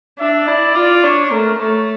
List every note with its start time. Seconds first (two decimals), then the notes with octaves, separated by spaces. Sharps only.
0.19 D4 E5
0.47 E4 D5
0.75 F4 D5
1.03 D4 C#5
1.31 A3 A#4
1.60 A3 C#5